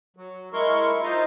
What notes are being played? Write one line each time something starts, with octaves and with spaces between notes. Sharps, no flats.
F#3
G#3 E4 A#4 C6 C#6
D#4 F4 C5 D#5 F5